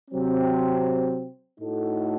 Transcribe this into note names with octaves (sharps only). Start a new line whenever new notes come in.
C3 F#3 C4
A2 A3 D#4 F#4 A4